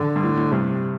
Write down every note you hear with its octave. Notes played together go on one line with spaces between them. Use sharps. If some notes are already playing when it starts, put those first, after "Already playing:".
Already playing: D3
G2
A2
A2
G2 C3